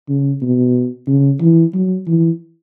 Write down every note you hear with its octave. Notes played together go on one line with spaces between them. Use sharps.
C#3
B2
C#3
E3
F#3
E3